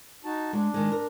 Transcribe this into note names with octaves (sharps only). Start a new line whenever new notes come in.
D#4 F#4 A5
G#3 D4
D#3 G#3
A#4